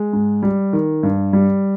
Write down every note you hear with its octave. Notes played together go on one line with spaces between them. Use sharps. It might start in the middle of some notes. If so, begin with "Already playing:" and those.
Already playing: G#3
G#2
G3
D#3
G2
G3